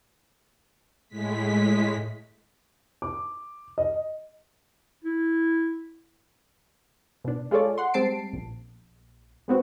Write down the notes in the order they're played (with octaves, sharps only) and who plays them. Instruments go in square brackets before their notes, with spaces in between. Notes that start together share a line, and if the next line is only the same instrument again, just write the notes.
[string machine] A2 G#3 B6
[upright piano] D6
D#5
[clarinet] E4
[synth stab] B2 D4
G#3 F4 G#4 A4 C#5 D5
F#5 C6
G3 G#3 C4 A5 C7 D7
A#1
G#3 B3 C4 F#4